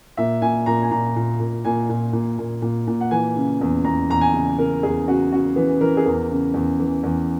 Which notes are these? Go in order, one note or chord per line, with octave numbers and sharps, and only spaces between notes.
A#2 E5
A#2 G#5
A#2 A#5
G#5
A#2 A#5
A#2
A#2
A#2 G#5
A#2
A#2
A#2
A#2
A#2
F#5
E3 G#5
C#3
E2
E2 A#5
E2 A#5
G#5
C#3
C#3 A#4
E2 G#4
C#3 F#4
C#3 F#4
E3 B3
E3 A#4
G#4
E2 A#4
C#3
E2
E3
E2